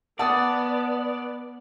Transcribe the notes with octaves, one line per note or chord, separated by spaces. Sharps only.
B3 D5 F#5 A5 D#6 A6